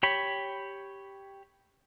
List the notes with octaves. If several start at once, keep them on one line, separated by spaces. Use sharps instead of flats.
G4 C#5 B5